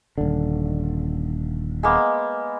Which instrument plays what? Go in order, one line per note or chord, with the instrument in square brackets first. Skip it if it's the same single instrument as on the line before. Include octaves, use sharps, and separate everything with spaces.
[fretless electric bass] D#1 D3
[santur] G#3 A#3 B3